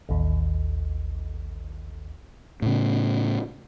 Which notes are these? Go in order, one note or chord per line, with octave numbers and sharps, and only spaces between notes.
A1 D#2
A2 C#3